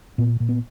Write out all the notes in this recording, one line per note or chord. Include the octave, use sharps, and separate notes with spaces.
A#2 B3
A#2
B3